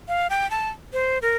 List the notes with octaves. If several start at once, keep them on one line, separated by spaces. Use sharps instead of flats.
F5
G5
A5
C5
A#4